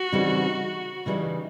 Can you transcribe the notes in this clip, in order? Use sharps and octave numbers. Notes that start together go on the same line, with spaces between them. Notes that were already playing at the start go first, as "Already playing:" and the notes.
Already playing: F#4
C#3 E3 G3 C4 D#4
C#3 E3 G3 C4 D#4